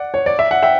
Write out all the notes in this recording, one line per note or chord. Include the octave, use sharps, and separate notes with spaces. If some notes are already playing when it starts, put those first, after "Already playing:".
Already playing: D5 F#5
C#5
D5
E5
F#5
E5 G5